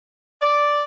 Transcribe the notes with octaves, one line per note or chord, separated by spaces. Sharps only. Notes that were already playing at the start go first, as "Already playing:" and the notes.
D5